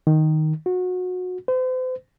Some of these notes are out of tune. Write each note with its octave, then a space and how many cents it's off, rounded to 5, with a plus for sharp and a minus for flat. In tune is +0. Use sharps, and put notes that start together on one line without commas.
D#3 +0
F#4 -25
C5 -40